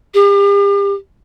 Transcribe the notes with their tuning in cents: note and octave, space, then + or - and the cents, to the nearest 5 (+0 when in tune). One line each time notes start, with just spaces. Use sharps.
G4 +40